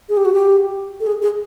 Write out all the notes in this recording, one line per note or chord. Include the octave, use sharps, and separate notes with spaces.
G#4
G4
F#4
G4
A4
G#4
G#4